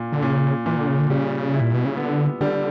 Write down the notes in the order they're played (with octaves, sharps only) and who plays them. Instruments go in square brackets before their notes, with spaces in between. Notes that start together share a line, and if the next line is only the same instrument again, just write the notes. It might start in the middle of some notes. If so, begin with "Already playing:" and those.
Already playing: [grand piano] A#2 A#3
[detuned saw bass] D3
[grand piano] A#2 [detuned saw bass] C#3
[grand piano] A#2 [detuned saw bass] E3
[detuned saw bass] D3
C#3
D3
[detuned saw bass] C#3 [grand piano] G3
[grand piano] E4
[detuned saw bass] A#2
B2
C#3
[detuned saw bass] D3 [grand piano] B3
[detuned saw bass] D3 [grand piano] G3